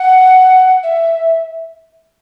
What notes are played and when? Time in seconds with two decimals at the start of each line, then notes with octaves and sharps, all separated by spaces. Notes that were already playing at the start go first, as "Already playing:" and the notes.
Already playing: F#5
0.83 E5